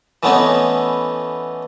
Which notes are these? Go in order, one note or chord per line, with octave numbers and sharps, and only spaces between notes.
E3 A3 B3 C#4 D#4 E4